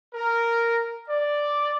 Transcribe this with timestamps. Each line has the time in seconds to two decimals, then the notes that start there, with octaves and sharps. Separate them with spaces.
0.14 A#4
1.08 D5